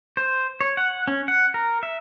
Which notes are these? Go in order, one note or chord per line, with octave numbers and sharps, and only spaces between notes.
C5
C#5
F#5
C#4
F#5
A#4
E5